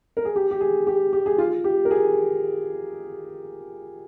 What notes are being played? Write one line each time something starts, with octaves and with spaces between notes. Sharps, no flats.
A#4
G#4
G4
G4
G#4
G4
G4
G#4
F4
G4
A#4
G#4